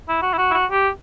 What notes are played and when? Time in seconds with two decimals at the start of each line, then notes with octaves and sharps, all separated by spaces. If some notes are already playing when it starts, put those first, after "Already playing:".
0.09 E4
0.22 F#4
0.33 E4
0.38 F#4
0.51 E4
0.54 F#4
0.71 G4